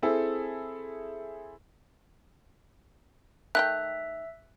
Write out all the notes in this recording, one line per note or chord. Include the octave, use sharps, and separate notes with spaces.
C4 E4 G#4 A4
D#3 A3 E5 G5 F#6